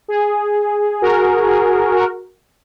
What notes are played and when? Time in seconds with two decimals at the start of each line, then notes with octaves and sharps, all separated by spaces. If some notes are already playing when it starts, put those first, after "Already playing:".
0.08 G#4
1.02 F#4 A#4
1.48 G#4
1.95 F#4 A#4